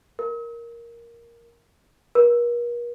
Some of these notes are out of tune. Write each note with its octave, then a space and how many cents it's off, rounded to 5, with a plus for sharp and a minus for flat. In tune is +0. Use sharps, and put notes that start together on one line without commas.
A#4 +5
A#4 +45